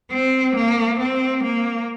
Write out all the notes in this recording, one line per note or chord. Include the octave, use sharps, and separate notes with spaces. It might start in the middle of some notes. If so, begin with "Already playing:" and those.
C4
A#3
C4
A#3